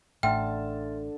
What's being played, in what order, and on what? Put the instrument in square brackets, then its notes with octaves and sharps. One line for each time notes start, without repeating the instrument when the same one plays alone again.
[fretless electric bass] A1 A2 [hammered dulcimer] D3 A5 [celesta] E5 C6 F6 [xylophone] G5